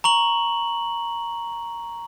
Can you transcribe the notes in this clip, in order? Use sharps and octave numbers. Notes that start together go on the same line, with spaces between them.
A#5 C#6 F#7